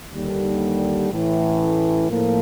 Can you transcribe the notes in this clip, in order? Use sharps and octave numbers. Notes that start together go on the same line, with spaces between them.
D#2 D3 G3
A1 A2 E3
A2 F3 A#3